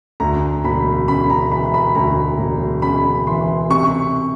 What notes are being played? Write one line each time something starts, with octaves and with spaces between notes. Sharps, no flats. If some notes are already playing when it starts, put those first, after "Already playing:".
D2 A#5
E1 B5
C#3 B5
A#5
E3 B5
B5
D2 A#5
E1
C#3 B5
E3 C6
C3 C#6